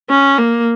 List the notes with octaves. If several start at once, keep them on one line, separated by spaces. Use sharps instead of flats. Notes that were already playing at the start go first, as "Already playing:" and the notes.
C#4
A#3